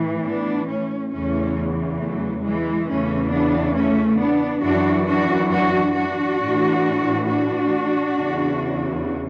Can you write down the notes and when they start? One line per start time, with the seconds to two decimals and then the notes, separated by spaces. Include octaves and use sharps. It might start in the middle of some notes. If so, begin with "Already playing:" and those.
Already playing: A2 E3
0.25 B3 D4
0.68 A3 C#4
1.12 E2 C#3 E3 A3 C#4
2.00 F#3 A3
2.44 E3 G#3
2.88 E2 C#3 E3 A3 C#4
3.32 B3 D4
3.76 A3 C#4
4.20 B3 D4
4.64 F#2 E3 D4 F#4
5.08 D4 F#4
5.51 D4 F#4
5.96 D4 F#4
6.40 A2 E3
7.27 D4 F#4
8.16 E2 C#3 E3